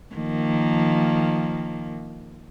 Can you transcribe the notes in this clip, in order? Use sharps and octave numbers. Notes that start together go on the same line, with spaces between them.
D#3 F3 A#3